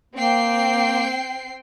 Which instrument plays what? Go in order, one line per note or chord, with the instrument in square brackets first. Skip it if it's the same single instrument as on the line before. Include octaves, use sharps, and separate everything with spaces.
[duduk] A#3 [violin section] C4 G5 C7